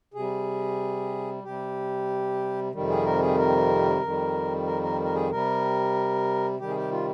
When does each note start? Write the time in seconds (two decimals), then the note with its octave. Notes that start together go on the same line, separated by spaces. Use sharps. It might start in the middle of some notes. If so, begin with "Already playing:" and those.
0.14 C3 G#4
0.19 G3
1.43 C3 G3 G4
2.72 F2 C3 D#3 G3
2.89 G#4
3.05 A#4
3.21 G#4
3.37 A#4
4.01 F2 D#3 G3
4.66 A#4
4.82 A#4
5.04 A#4
5.14 G#4
5.30 C3 G3 A#4
6.59 C3 D#3 G3 G4
6.69 G#4
6.76 G4
6.91 F4